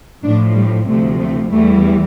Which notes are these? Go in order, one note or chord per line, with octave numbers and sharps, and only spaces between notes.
A2 F3 D4
G3
D2 C3 F3 A3
A3
E2 E3 G3 A3